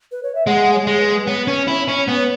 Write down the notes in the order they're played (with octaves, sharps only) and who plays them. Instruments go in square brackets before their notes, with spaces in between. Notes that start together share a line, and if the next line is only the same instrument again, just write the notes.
[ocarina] B4
C#5
E5
[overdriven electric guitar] G#3 [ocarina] F#5
[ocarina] C#5
[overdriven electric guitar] G#3
[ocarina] B4
[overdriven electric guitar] B3 [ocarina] C#5
[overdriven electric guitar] C#4
E4
C#4
B3